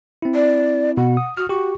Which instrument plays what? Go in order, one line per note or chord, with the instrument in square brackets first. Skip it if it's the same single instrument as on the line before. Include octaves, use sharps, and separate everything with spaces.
[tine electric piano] C4 E4
[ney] D5
[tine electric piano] B2 [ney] F#5
[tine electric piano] D#6
[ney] F#4 [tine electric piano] D#6 F6
[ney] F#4 [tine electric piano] G4 C#6